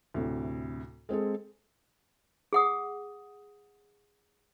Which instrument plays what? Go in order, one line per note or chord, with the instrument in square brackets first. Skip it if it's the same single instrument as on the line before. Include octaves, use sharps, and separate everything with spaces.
[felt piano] D2 A2 C3
G#3 C4 G#4 A4
[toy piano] G#4 F#5 D#6